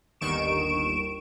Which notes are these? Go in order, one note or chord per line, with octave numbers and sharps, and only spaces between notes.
G1 D#2 D#3 C#6 D7 E7